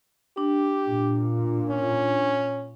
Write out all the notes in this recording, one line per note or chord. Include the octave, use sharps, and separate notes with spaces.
D4 G4
A#2
C#4